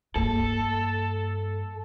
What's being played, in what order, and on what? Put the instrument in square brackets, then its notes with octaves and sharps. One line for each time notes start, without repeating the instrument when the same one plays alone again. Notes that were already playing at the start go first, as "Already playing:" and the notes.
[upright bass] G2 A#3 [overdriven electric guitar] A4